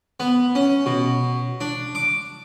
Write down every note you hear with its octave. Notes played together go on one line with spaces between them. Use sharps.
B3
C#4
B2
D4
D6